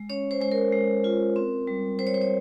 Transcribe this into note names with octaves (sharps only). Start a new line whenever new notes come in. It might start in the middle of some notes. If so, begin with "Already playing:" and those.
Already playing: G#3
C#4 C#5
C5
G#3 C5
A#4
G#3
F4
C4
G3
G3 C5
C#5
C5
C#5